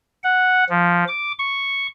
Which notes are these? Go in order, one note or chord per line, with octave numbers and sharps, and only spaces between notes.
F#5
F3
D6
C#6